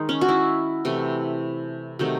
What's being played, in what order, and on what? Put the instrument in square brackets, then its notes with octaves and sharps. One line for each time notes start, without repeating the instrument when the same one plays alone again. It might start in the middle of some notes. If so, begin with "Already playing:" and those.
Already playing: [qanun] D#3 G#3 D#4
C#4
F#4
E4
C3 E3 A3
C3 D#3 F#3 A3